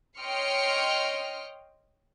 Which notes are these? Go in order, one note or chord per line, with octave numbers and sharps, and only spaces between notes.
C#5 D#5 G5 C6 F6 C#7